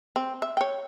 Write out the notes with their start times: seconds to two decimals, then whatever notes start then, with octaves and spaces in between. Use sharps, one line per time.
0.16 C4
0.42 E5
0.57 C#5 G5